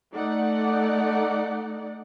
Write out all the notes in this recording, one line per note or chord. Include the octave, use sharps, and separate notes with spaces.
A3 D#4 D5 F#5